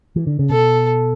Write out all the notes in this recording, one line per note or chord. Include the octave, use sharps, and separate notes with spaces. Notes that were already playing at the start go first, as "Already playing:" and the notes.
E3
D3
C#3
B2 A4